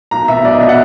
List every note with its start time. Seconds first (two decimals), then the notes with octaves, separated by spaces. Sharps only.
0.11 B1 A#5
0.28 B2 E5
0.44 B1 D5
0.53 D#5
0.61 B2 E5
0.69 F#5